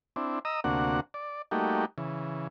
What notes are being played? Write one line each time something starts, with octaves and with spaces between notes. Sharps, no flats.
C4 D4 E4
D#5 A#5 D#6 E6
D2 C3 A#3 D4 F#4 F#5
D5
G3 A3 A#3 D#4 F#4 G4
C#3 E3